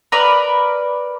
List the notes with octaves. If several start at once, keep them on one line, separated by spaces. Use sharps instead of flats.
A#4 B4 D5